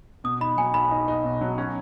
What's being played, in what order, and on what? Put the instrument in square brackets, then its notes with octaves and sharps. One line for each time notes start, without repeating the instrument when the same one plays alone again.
[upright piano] B2 [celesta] D#6
[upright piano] D#4 [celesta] B5
[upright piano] F#3 [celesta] G#5
[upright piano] B1 [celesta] B5
[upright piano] D#4
D#4
B2
F#3
C#4